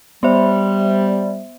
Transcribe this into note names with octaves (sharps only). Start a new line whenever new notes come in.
G3 B3 C5 E5